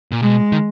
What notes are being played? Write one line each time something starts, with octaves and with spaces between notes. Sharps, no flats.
A#2
B2 G#3
D#3